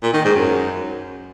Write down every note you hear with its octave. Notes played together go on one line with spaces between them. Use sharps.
A#2
D#3
G#2
F#2